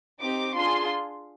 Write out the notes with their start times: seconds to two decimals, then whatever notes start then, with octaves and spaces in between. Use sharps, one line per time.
0.19 C4 D#4 G4 D6
0.53 D4 F4 G#4 C6